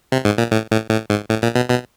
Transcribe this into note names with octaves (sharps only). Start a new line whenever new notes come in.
C3
G#2
A#2
A2
A2
A2
G#2
A2
A#2
B2
B2